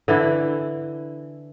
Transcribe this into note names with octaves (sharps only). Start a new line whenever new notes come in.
D3 E3 E4